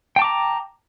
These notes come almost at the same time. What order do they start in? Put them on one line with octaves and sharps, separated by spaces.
G5 A5 D6 A#5